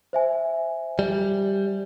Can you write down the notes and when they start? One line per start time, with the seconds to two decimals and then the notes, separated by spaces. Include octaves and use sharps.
0.13 C5 E5 G#5
0.99 G3